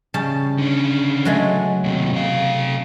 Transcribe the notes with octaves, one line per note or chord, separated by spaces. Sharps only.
C#3 G3 A5
D3 C#4
F#3 G#3 A3
D#2 C3
C3 F5